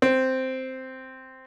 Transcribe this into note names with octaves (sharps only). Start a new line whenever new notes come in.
C4